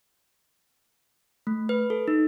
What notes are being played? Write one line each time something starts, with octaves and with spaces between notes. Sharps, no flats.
A3
B4
A4
D#4